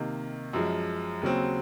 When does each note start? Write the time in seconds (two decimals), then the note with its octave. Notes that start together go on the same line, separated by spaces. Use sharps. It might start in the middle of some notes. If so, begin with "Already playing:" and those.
Already playing: C3 D#3 A#3
0.53 F#2 F3 G#3
1.22 D#2 C#3 F#3 C4